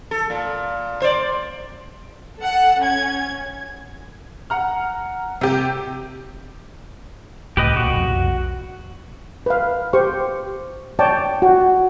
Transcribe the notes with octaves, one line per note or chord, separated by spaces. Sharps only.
A4
A#2
C5 D5
A4 F#5
C#4 G#6
F#5 A#5 F6
C3 G4
C#2 A2 G4 B4 D#5
C2 A#2 F#4
B1 F2
B4 F5
G4 C5 C#6
C#5 D5 G5 A5
F#4